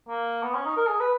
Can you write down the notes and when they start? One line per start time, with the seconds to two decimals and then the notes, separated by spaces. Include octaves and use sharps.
0.09 A#3
0.43 B3
0.55 C#4
0.65 D#4
0.77 A#4
0.88 G#4
1.00 B4